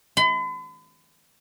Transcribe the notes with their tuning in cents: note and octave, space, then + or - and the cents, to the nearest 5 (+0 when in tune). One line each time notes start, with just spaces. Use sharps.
B5 +45